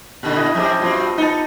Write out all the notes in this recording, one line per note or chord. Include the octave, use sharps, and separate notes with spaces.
A#2 D3
E4 D#5
F2 G4 A4 C5
G2 B2 C4 F4
B3 D#4 A5